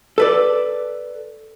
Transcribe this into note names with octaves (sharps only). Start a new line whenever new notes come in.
A4 B4 D5